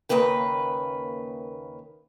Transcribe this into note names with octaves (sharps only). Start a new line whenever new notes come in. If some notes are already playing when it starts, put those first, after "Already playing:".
D#2 C#3 A#3 B4 G5